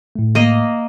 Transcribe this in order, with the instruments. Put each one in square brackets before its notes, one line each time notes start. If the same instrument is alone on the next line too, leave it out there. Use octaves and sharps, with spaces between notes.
[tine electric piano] A2 A3
[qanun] A#3 D#5